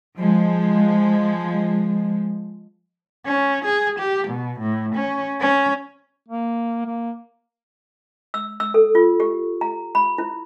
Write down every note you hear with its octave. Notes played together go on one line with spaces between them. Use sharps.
F3 G#3
C#4
G#4
G4
B2
A2
C#4
C#4
A#3
A#3
E6
E6
A4
F4
G4
A#5
B5
E4